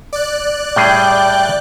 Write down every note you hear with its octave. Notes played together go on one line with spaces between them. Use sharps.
D5 F#6
A2 G3 G#4 G5